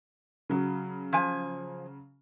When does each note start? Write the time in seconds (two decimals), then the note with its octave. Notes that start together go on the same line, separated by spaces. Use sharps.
0.49 C#3 F#3
1.13 F3 G#5